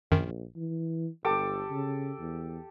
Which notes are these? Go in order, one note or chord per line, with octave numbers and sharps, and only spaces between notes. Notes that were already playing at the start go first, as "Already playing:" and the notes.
A#1 F#2 D#3
E3
G1 G4 A4 D6
C#3
E2